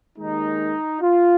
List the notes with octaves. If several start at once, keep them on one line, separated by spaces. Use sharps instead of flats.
D#2 D#3 G#3 D#4
F4